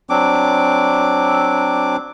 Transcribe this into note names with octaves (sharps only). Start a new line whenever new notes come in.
F#3 C4 D4 D6